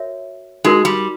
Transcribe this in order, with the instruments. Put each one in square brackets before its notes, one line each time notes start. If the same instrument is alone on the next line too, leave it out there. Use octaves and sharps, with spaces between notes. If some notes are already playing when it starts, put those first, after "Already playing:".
Already playing: [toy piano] F#4 A#4 C#5 E5
[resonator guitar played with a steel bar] G#3 [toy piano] D#4 F#4 A#4
[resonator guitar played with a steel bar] G3